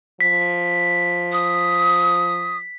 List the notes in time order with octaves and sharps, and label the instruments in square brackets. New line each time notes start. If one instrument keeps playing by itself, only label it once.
[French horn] F3 [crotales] B6
[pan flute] D#6